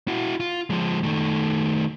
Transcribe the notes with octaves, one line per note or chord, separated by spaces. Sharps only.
E4 F#4
F4
F3 G#3
D#3 A3